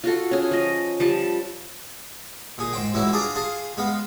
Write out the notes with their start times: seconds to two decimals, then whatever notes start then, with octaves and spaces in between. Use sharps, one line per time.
0.04 F4 F#4 A4
0.31 C#4 G#4
0.51 F3 D#5
1.00 F3 G3 A5
2.58 A#2 G#4
2.73 G#2 C5 G5
2.94 C#2 A2 E3 F#3 E4
3.12 D4 F4 G#4 D5 A#5
3.35 F4 G#4 F5 A5
3.77 G#3 B3 F5